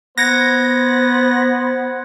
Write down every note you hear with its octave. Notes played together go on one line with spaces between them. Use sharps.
B3 C5 F#6 G#6 A#6 C#7